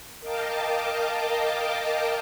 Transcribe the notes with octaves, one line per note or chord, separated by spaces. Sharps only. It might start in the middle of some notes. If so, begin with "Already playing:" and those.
A#4 D#5 F5 G5 A5 D6